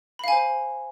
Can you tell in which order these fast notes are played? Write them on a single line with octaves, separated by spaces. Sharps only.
B5 F5 G#5 C5